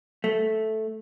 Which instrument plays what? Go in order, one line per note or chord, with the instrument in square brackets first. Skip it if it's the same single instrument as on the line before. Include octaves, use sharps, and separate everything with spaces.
[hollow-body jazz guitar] A3